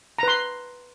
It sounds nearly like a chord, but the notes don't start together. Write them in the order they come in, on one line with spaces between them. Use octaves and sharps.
A#5 B4 C6